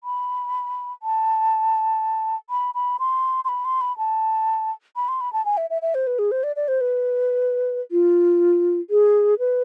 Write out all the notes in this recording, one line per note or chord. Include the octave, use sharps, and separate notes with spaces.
B5
A5
B5
B5
C6
C6
B5
C6
B5
A5
B5
C6
B5
A5
G#5
E5
E5
E5
C5
B4
G#4
C5
D5
D5
C5
B4
F4
G#4
B4